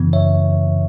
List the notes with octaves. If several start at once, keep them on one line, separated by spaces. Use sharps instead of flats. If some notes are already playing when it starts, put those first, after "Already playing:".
Already playing: F#2 C#3 E3 B3
C#5 E5